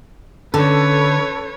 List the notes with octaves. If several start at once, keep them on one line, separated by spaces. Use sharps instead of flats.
D3 C#4 D4 A4 B4 C#5